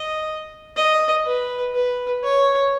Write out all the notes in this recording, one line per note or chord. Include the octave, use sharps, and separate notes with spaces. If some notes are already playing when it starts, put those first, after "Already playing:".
Already playing: D#5
D#5
B4
B4
C#5